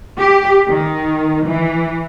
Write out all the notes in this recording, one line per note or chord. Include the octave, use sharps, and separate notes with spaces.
G4
D#3
E3